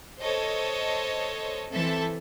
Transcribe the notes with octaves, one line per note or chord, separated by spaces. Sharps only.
A4 C5 C#5 D#5
E3 C4 A4 E5 A5